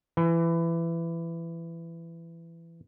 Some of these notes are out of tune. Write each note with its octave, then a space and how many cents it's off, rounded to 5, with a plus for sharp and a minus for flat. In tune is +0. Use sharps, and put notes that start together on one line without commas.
E3 +20